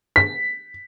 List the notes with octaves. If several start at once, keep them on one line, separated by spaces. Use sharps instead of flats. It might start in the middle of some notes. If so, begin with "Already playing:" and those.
B6